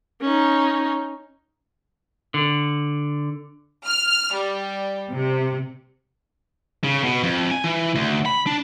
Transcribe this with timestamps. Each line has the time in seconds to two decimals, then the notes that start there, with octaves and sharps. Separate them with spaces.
0.22 C#4 D#4
2.34 D3
3.85 F6
4.35 G3
5.11 C3
6.84 C#3
7.04 B2
7.23 F2
7.51 G#5
7.64 E3
7.95 D2
8.26 B5
8.47 D4